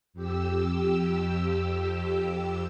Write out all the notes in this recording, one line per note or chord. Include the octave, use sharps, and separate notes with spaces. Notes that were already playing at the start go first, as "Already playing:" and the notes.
F2 G4 E6